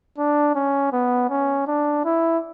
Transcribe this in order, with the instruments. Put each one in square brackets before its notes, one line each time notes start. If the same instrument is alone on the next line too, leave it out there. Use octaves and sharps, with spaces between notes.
[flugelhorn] D4
C#4
B3
C#4
D4
E4